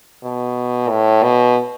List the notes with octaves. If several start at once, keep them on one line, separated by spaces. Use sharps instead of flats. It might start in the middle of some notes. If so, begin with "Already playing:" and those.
B2
A2
B2